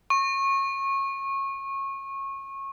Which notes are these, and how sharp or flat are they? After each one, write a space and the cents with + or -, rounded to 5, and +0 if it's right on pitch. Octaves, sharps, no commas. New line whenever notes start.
C#6 -25